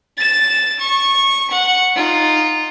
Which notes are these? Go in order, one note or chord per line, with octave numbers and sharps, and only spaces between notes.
A6 E7
C#6
F#5 C#7
D#4 F4